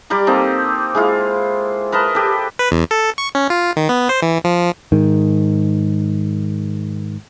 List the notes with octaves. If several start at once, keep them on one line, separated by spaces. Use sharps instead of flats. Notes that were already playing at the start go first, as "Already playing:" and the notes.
G3 G4 D5 A#5
A#3 C4 D#4 A4
G#3 E4 F4
A#4 B4 D#5 A5
G4 A4
B4
E2
A4
C#6
C#4
F4
D#3
B3
C5
E3
F3
G#2 D#3